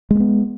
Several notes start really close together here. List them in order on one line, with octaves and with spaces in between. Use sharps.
G#3 A#3 B3